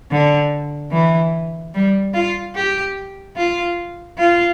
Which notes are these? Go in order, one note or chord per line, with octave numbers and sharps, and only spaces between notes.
D3
E3
G3
F4
G4
F4
F4